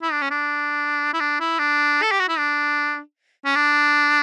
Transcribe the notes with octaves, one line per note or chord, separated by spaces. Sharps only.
E4
D4
C#4
D4
E4
D4
E4
D4
A4
G4
F#4
E4
D4
C#4
D4